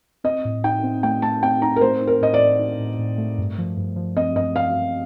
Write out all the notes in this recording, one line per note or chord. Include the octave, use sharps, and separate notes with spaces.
C4 D#5
A2
D#4 G5
C4
A3 G5
A3 A5
C4 G5
D#4 A#5
A#4
A3 C5
D#4
A#4
A2 D#5
D5
A2
D#4
A2
A2
A3
G2
F3
G2
F3
C4 D#5
G2 D#5
F3 F5
G2